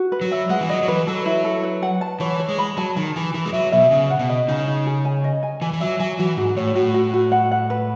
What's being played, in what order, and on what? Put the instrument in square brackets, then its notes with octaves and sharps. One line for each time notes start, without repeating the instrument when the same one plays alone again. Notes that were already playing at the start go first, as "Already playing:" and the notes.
Already playing: [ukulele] F#4
B4
[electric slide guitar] F#3
[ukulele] E5
[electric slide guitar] G#3 [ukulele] F#5
[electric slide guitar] E3
[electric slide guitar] F#3 [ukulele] D#5
[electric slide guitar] F#3
[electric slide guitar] E3 [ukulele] B4
[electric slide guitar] F#3 [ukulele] A4
[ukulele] E4
A4
B4
F#5
A5
[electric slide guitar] E3 [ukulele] C#5
[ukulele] C#5
[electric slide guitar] G#3
[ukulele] B5
[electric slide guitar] F#3 [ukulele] A5
[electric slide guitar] D#3 [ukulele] A5
[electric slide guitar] E3 [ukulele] G#4
[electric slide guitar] E3 [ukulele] B4
[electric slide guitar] G#3
[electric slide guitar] F#3 [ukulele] E5
[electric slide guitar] B2 [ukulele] E5
[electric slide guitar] C#3 [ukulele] G#4
[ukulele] F#5
[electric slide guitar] B2
[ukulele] D#5
[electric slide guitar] C#3 [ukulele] D#4
[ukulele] D#4
G#4
G#5
D#5
G#5
[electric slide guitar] E3 [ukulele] G#5
[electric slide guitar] E3
[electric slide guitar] F#3 [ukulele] E5
[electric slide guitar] F#3 [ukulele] G#5
[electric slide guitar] E3 [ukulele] F#4
[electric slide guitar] G#2 [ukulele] F#4
[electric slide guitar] A2 [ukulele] C#5
[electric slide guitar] A2 [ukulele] F#4
[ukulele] F#4
F#4
F#5
F#5
B4